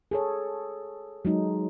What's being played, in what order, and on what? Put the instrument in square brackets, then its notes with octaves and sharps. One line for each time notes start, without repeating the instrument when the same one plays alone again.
[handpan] G#4 A4 C#5
F#3 G#3 D#4